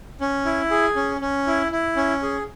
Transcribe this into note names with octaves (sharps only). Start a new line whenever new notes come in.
C#4
E4
G#4
C#4
C#4
E4
E4
C#4
G#4